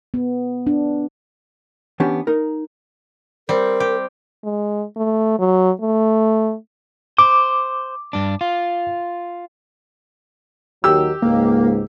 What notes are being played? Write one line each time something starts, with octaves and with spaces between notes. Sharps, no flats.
B3
D4
E3 B3 C#4 D4 G4
D#4 A#4
G3 C4 A#4
G4
G#3
A3
F#3
A3
C5 D6
G2 D4
F4
D#2 D#3 F#3 G4 E6
C#2 G#2 A#3